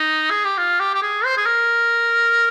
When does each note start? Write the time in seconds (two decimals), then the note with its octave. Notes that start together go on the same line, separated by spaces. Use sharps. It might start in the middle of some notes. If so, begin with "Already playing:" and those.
Already playing: D#4
0.30 G#4
0.45 G4
0.58 F4
0.80 G4
0.94 G4
1.02 G#4
1.25 C5
1.37 G#4
1.46 A#4